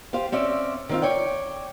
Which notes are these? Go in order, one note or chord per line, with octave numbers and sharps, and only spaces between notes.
F4 G4 C5 F5
C4 C#4 D5 E5
D#3 C4 F4
C#5 D5 G5